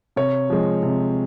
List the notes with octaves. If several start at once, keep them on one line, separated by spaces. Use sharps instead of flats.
C3 C#5
F3 G#3
C3